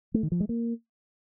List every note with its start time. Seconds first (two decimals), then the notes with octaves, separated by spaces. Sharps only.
0.14 A3
0.23 D#3
0.32 F3
0.40 G#3
0.49 A#3